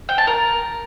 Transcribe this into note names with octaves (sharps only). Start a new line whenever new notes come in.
G5
A5
A#4